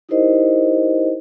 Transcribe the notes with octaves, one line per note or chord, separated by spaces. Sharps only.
D#4 E4 G4 A#4 C5 D#5